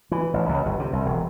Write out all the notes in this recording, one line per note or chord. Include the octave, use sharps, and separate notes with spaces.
E3
A1
C#2
G1
C3
C2
E1